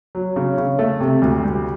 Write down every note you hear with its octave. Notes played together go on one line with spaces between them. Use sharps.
F#3
C#3
C#3
A3
C3
D2
G3